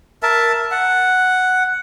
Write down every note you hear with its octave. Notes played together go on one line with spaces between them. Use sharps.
A#4 E5 A5
F#5